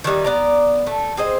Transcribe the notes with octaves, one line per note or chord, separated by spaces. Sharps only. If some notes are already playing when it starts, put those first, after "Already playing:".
D#3 E3 G3 D#4
B3 D5 A#5
A3
C4 G#4 C5 D#5